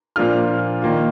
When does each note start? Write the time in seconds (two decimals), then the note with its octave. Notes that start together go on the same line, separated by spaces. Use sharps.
0.16 A#2 F3 A#3 D4 F4 F6
0.82 D#3 A#3 F4